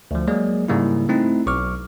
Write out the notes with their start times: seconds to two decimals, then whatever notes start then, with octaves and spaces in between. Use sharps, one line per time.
0.11 D2 F3
0.27 F#3 G#3 A#3 G#4 D5
0.68 G#2 C#3 G3 A#3 E4
1.09 A3 C4 D#4 E4
1.46 B1 C#6 D6 F6